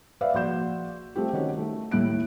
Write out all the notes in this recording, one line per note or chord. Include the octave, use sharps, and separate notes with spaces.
B4 D5 E5 F5
A#1 F#4 D5 C6 G6 E7
A3 C4 F4 G4
D#3 C#4 F#4 G4
A3
D#2 A2 E4 F#6 D7